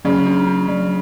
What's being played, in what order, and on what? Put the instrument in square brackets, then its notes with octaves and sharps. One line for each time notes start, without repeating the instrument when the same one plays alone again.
[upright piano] C#3 [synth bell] F#3
[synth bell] D4
D4
F#3